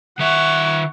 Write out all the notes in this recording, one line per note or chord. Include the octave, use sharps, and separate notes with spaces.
D#3 E5 F#5 C#6